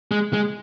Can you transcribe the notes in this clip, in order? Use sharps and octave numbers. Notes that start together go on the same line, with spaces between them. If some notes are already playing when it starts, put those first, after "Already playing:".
G#3
G#3